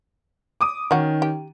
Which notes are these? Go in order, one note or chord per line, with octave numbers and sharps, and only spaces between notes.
D6 D#6 D#7
D#3 C#4 D#4 F#4
G4